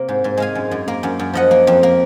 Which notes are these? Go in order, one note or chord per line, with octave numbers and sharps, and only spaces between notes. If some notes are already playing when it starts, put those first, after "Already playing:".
Already playing: C3 A#3
G#2
G#2
G#3 F5 G#5
F#2
F#2
A#3
F#2
F#2
F3 D#5 F#5
A#3
F2
A#3